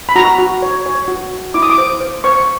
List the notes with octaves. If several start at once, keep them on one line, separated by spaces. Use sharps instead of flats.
B5
F#4 A#5
F#4
C#5
C#5
F#4
F#4
E4 D6
D#6
D6
C5
C5
C5 C#6